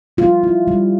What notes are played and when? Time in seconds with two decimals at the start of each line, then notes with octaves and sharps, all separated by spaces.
0.17 G3 F4
0.43 E4
0.68 G3